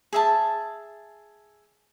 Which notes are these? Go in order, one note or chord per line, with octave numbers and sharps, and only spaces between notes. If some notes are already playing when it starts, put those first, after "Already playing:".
G#4 E5 A5